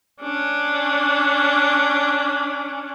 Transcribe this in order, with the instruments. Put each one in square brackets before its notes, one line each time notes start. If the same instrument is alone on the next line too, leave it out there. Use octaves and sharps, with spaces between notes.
[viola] C#4 D4